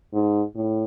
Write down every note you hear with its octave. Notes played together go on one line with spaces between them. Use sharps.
G#2
A2